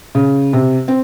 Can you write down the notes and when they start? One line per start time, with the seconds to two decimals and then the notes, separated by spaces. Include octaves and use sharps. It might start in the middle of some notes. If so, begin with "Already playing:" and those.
0.15 C#3
0.53 C3
0.88 C4